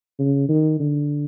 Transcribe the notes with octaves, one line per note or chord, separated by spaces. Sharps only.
C#3
D#3
D3